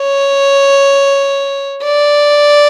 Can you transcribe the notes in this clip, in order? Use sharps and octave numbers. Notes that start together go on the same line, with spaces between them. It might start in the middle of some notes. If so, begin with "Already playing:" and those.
Already playing: C#5
D5